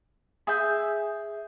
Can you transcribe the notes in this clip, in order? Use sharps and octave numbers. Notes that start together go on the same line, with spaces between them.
G#4 E5 G6